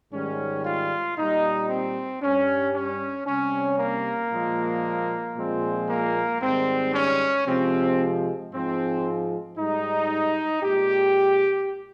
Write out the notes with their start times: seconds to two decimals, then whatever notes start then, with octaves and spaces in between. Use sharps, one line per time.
0.11 G#2 D#3 G3 C#4
0.64 F4
1.16 A#2 G3 D#4
1.68 C4
2.21 G2 G3 C#4
2.73 C#4
3.26 C3 G3 C#4
3.78 A#3
4.31 A#2 F3 G#3
5.36 A#2 F3 G#3 C4
5.89 A#3
6.41 G#2 D#3 G3 C4
6.94 C#4
7.47 C3 F3 G#3 C4
8.52 G#2 F3 G#3 C4
9.57 G#2 G3 D#4
10.62 A#2 G#3 G4